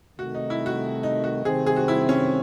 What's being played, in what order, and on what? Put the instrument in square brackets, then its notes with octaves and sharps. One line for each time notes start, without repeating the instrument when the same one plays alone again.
[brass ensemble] C3 D#3 A3 [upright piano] F#4
[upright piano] D#4
E4
F#4
D#4
F#4
[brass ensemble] C3 D#3 A3 C4 [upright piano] G#4
[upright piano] G#4
F#4
E4
C#4